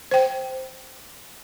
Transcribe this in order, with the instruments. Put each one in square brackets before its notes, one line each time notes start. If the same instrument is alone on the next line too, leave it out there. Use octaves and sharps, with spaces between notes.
[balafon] C5 G5